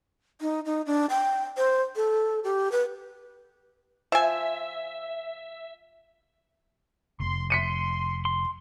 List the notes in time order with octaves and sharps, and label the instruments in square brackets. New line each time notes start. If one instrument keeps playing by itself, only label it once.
[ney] D#4
D#4
D4
G5
C5
A4
G4
B4
[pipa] F3 G#5 [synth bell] E5
[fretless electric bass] F1 [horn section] C6
[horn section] C6 [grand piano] B6 C#7 D#7
[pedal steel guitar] C6